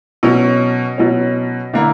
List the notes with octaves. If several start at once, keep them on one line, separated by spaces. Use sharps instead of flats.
B2 F#3 C#4
B2 F#3 C#4
D3 A#3 E4